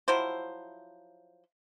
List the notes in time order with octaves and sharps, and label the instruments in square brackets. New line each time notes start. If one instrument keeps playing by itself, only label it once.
[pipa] F3 F#3 E4 C5